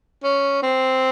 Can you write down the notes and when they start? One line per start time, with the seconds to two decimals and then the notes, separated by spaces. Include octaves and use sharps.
0.24 C#4
0.63 C4